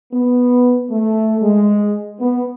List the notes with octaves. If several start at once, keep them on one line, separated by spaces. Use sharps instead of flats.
B3
A3
G#3
B3